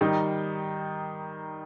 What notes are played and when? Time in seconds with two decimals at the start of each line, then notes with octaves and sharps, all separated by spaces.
0.01 D#3 G3 D#4